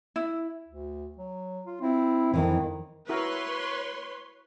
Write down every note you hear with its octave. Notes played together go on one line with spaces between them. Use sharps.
E4
D2
F#3
F4
C4 E4
F2 D#3 E3
E4 F#4 A#4 B4 C#5 C6